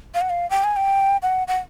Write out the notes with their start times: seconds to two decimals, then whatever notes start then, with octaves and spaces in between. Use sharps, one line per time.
0.15 F5
0.21 F#5
0.30 F5
0.50 G5
0.64 G#5
0.76 G5
1.22 F#5
1.48 F#5